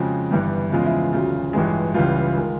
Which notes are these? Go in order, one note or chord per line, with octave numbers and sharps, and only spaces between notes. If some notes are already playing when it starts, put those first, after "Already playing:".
Already playing: F2 C#3 F3 G#3 F#4
G1 G2 E3 G3
E2 C#3 F3 G#3 F4
E4
E1 D2 C#3 F#3 F4
A1 G2 E3 G#3
C#2 C#3 E3 G3 F4
D#3 G#3